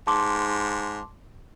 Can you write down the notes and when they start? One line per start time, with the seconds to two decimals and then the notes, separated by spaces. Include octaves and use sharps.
0.07 G#2 A5 C6 D6